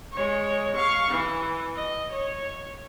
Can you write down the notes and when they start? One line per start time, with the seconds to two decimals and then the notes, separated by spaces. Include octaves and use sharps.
0.12 G#3 C#5
0.74 F5 C#6
1.11 E3
1.76 D#5
2.12 C#5